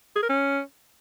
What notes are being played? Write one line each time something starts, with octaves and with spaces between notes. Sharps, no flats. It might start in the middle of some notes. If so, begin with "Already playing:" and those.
G#4
A#4
C#4